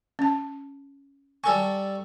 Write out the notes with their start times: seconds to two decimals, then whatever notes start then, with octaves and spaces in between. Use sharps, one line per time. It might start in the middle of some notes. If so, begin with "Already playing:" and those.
0.19 C#4 A5
1.44 G3 A4 G#5 C#6